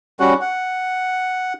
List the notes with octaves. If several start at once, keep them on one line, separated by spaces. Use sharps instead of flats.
G3 C#4 F#4 F#5
F#5